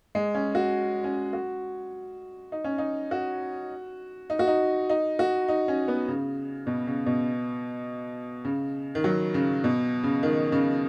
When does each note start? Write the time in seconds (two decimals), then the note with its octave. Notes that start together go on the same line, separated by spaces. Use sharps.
0.15 G#3
0.35 C#4
0.55 F#4
1.04 C#4
1.33 F#4
2.52 D#4
2.64 C#4
2.78 D#4
3.11 F#4
4.30 D#4
4.39 F#4
4.47 D#4
4.90 D#4
5.19 F#4
5.48 D#4
5.68 C#4
5.88 B3
6.08 C#3
6.67 B2
6.87 C#3
7.06 B2
8.45 C#3
8.95 D#3
9.04 F#3
9.34 C#3
9.64 B2
10.03 C#3
10.23 D#3
10.52 C#3